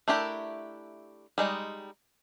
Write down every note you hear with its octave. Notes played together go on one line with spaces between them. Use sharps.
A3 D4 E4 G4 A#4
G3 G#3 D#4